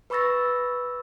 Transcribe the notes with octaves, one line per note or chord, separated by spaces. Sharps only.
B4 B5 C#6 E6 A6 A#6